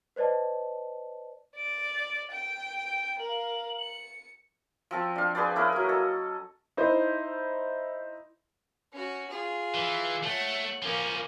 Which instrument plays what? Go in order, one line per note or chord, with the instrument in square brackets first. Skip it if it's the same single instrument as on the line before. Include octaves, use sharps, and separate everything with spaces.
[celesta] B4 C5 D5 D#5 A5
[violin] D5 [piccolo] D7
[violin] G5 [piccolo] D7
[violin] A#4 F5 [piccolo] F#7
[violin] C#7
[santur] F3 C4 A5
D4 F5
G#4 B4 C5 D5
C#4 E4 A#4 B4
F#3 A#3
A4 D#5
[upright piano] D#4 E4 C5
[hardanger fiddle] C#4 F#4
F4 G#4
[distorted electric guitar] E3
[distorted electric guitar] A3 [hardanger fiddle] C#5 F#5
[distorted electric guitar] F3 C#4 [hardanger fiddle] A#3 G#5